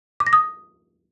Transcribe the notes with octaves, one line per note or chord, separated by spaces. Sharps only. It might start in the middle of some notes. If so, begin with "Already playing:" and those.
D6
A#6
D#6